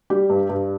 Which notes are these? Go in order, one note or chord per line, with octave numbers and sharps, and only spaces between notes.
G3 G4
G2
G2